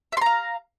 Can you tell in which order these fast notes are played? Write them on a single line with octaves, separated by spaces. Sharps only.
E5 C6 A#5 F5